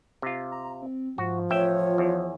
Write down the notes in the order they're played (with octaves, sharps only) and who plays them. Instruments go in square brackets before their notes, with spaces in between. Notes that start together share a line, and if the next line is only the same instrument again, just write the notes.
[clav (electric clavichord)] C3 F4
[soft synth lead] A#5
C4
[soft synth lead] G#2 [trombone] F3 [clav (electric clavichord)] F#4
[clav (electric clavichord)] A1 E5 G5 [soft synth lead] F4 [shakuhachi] C#5
[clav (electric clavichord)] E2